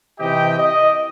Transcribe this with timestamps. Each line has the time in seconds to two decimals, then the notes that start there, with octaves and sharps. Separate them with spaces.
0.19 C3 E3 G4 D#5 G5
0.57 D#5